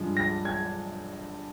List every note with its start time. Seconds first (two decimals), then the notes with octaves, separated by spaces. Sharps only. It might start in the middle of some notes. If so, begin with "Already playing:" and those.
Already playing: G2 F3 G#3
0.17 A#6
0.45 G#6